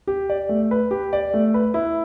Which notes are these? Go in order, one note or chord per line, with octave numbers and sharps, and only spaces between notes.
G4
D5
A3
B4
G4
D5
A3
B4
E4